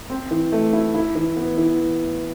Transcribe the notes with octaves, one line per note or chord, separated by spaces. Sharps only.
C4
E3
A3
E4
E4
E3
B3
E3